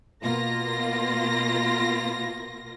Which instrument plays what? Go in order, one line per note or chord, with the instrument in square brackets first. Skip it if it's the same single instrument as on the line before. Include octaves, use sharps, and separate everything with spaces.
[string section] B2 A#3 F4 A#6